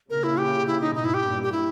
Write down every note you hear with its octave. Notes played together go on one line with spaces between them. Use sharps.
A#2 C#3 A#4
E4
G4
E4
D#4
G#2 B2 D#4
E4
G4
G2 A#2
G4
E4